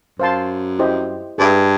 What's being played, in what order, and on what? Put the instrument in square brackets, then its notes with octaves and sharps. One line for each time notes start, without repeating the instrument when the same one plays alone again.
[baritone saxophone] F#2 [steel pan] C5 F5 A5 C6
[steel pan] E4 G4 C5 D#5
[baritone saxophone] G2 [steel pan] G#4 B4 E5